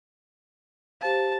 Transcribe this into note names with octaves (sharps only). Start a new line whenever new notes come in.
G4 C5 F5 A5